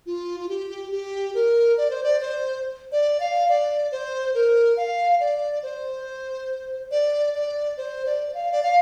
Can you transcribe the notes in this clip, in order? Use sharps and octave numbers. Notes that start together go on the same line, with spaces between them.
F4
F4
G4
G4
A#4
D5
C5
D5
C5
D5
F5
D5
C5
A#4
F5
D5
C5
D5
D5
C5
D5
F5
D5
F5